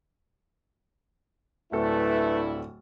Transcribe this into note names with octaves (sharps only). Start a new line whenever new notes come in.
D1 G2 A3 D4 E4 A4 B4